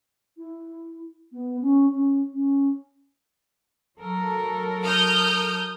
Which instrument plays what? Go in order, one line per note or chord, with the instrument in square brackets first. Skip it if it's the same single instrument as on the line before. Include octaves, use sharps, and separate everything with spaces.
[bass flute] E4
B3
C#4
C#4
C#4
[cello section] F#3 A4 A#4
[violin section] D#6 F6 G6